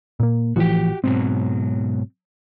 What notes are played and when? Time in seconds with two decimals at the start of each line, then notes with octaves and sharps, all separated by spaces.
0.20 A#2 A#3
0.56 A1 E3 F3 F#4 G4
1.04 G#2 B2 F#3 C4